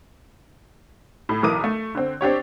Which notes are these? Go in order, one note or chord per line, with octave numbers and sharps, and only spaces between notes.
A2
B1 E3 A#4 D6 D#6 D#7
A3
D3 C4
C4 D4 G4 C#5